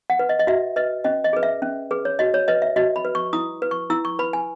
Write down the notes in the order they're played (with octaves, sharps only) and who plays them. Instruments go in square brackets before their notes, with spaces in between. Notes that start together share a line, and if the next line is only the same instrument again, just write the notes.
[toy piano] F#5
B4
D#5
D#5
F#4 E5
B4 D#5
C#4 D#5
D#5
G#4 B4
E5
C#4
G#4 B4
C#5
F#4 D#5
C#5
B4 D#5
E5
F#4 D#5
B5
B4
C#6
E4 D#6
B4
C#6
E4 E6
C#6
B4 B5
G#5